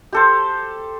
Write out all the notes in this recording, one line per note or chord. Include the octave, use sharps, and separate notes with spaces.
G4 A4 C5